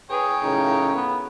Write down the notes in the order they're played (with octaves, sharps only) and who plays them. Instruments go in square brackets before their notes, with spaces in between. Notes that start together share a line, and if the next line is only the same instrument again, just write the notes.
[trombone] G#4 [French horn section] B4 [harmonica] C#5 G5
[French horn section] F#2 A2 C#3 [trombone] D#4
[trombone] B3